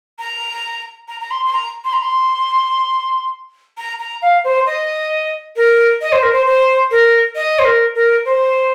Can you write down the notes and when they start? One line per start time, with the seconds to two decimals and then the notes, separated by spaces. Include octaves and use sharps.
0.19 A#5
1.08 A#5
1.20 A#5
1.31 C6
1.46 C6
1.53 A#5
1.85 C6
1.93 A#5
2.02 C6
3.78 A#5
3.99 A#5
4.22 F5
4.44 C5
4.67 D#5
5.57 A#4
6.01 D#5
6.12 C5
6.23 A#4
6.33 C5
6.46 C5
6.91 A#4
7.35 D#5
7.59 C5
7.65 A#4
7.95 A#4
8.25 C5